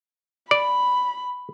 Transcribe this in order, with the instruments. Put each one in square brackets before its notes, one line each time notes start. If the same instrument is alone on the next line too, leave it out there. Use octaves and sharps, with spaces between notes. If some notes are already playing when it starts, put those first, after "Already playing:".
[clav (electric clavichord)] D5 [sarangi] B5